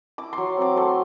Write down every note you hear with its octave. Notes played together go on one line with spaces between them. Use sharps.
E4 D6
F#3 C6
C4 D6
A3 C6